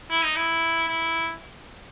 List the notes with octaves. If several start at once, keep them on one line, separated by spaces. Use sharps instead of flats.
E4
D#4
E4
E4